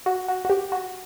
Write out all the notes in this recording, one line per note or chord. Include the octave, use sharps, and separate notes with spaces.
F#4
F#4
F#4
G4
F#4